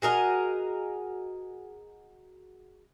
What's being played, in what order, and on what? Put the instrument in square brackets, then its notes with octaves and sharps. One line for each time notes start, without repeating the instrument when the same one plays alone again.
[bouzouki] F#4 G#4 A#4 D#5